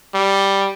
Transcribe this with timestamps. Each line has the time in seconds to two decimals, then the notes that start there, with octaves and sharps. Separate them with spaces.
0.14 G3